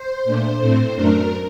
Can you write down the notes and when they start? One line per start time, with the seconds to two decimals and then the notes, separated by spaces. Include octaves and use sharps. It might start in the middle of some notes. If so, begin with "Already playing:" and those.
Already playing: C5
0.24 A#2 A3 D4
0.60 A2 A3 C4
0.95 F#2 F#3 A3 D4 A#4